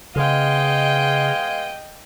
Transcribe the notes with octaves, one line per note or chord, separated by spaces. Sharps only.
C#3 G#3 B3 D#5 F5 G5